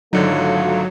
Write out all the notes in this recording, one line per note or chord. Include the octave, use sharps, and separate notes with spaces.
G#1 D3 F#3 A3 D#4 F4